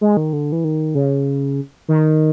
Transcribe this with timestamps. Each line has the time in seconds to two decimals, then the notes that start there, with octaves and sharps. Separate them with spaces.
0.01 G#3
0.17 D#3
0.33 D3
0.52 E3
0.64 D#3
0.95 C#3
1.88 D#3